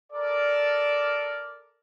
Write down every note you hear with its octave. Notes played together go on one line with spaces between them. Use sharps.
A4 A#4 D5